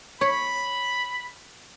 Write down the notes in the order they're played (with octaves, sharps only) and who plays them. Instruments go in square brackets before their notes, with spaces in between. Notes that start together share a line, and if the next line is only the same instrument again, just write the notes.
[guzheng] C#5 [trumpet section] B5